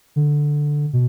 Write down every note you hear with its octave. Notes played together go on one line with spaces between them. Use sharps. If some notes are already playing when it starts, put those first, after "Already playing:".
D3
B2